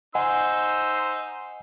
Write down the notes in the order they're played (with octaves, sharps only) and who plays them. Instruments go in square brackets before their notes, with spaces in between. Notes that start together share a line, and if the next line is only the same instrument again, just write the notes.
[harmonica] D#4 C5 E6 [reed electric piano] D#5 F#5 G#5